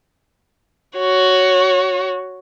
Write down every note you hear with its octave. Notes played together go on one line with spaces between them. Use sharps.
F#4 C#5